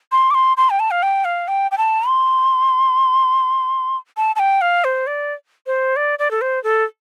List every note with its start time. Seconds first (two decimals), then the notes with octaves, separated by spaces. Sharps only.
0.12 C6
0.31 D6
0.34 C6
0.57 C6
0.70 G5
0.80 A5
0.91 F5
1.03 G5
1.25 F5
1.48 G5
1.71 G5
1.78 A5
2.08 C6
4.17 A5
4.36 A5
4.39 G5
4.61 F5
4.84 C5
5.07 D5
5.67 C5
5.96 D5
6.19 D5
6.31 A4
6.41 C5
6.64 A4